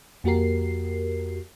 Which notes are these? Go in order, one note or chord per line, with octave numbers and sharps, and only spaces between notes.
F2 A#3 F#4 G4 A#4 C7